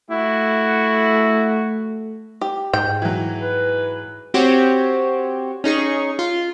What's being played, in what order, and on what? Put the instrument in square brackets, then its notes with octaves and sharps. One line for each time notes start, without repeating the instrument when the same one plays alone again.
[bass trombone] A3 [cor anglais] E4 [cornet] F#4
[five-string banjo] G4
[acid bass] G#2 [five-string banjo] G5
[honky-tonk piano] E3 F#3
[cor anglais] B4
[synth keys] C4 F#4 G4 C5 C#5
C#4 D#4 G#4 C#6
F4